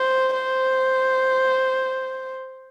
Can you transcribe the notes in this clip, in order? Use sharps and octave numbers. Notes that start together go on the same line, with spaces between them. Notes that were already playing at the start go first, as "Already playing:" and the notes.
Already playing: C5
C5